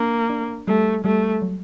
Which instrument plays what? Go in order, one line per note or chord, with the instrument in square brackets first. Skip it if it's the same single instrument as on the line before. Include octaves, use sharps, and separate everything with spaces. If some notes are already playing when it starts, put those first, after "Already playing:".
Already playing: [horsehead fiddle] A#3 [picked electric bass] D4
[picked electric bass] D4
[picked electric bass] G3 [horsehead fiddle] A3
[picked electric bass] G3 [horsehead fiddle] A3
[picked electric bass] F#3